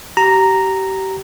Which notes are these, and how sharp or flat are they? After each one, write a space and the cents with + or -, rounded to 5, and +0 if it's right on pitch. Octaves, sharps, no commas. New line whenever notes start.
G4 -30 A#5 -5